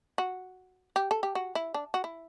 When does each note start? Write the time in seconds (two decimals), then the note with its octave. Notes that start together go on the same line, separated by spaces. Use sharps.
0.18 F#4
0.96 G4
1.11 A4
1.23 G4
1.35 F#4
1.55 E4
1.74 D4
1.94 F#4
2.04 E4